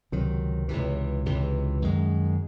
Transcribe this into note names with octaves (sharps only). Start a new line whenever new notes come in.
C#2 C3 D#3 F#3
C#2 C3 E3
C#2 C3 E3
F#2 D#3 G#3